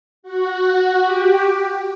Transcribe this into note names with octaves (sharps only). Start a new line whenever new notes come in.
F#4
G4